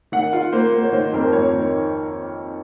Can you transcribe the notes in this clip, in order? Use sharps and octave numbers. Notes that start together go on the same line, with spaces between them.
D#3 F#5
F4
A#3 C5
A#3
C#5
D#3 C5
F2 A#4
C5
F2 C#5
D#3